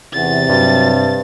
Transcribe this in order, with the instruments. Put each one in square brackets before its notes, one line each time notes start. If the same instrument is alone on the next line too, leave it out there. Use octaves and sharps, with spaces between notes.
[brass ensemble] E2 [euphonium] C3 [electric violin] A6
[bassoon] G2 [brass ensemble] F#3